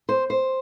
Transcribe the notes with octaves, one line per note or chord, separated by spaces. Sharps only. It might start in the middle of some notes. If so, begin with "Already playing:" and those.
C5
C5